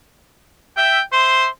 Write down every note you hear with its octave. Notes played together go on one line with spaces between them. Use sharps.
E5 G5
C5 E5 C6